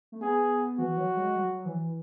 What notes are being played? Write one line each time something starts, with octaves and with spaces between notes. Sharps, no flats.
A3
B3 G#4
E3 F#4
F#3
G#3
F#3
E3